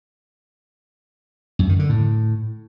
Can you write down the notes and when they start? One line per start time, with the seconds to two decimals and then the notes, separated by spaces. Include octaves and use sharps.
1.59 F#2
1.69 D#3
1.79 D3
1.89 A2